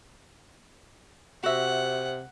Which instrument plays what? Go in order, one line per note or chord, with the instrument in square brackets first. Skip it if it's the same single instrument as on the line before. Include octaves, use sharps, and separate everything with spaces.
[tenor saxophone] C3 [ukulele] F#4 E5 [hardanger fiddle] F#5